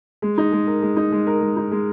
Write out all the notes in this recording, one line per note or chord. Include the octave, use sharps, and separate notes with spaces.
G#3
D#4
G#3
A#4
G#3
D#4
G#3
A#4
G#3
D#4
G#3